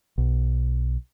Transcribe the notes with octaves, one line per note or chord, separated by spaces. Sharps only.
B1